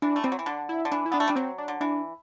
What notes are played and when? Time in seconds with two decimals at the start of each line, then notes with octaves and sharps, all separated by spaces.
0.02 E3 D4
0.16 A3
0.24 G3 C4
0.32 F#3
0.39 E3
0.46 D3 D4
0.69 E4
0.85 D3
0.92 E3 D4
1.06 E4
1.12 B3 D4
1.20 A3
1.28 G3 D4
1.36 F#3 C4
1.58 D4
1.68 D3
1.81 E3 D4